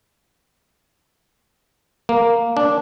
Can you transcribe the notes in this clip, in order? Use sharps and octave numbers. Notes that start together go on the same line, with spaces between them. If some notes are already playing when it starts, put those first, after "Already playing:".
A#3
D4